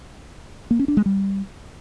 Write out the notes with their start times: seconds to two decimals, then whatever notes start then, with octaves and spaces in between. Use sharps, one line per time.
0.71 A#3
0.79 C#4
0.88 D4
0.97 G#3
1.06 G3